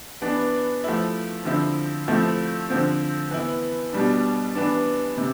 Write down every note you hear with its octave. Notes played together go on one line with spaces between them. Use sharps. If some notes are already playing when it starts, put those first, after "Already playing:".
E3 B3 D4
F3 A3 E4
D3 F3 C4 E4
F3 A3 C4 E4
D3 F3 C4
E3 B3 E4
B2 G3 D4
E3 B3 D4
C3